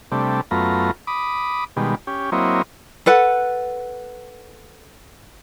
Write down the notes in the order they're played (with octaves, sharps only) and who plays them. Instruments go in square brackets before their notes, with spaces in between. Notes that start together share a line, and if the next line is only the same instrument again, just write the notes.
[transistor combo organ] C3 G3 A3 D4
F#2 A3 B3 F4 A#5
B5 D6 D#6
B2 D#3 G3 G#3
C#4 G4
F#3 A#3 C4 E4 C#5 D#5
[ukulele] A4 B4 F#5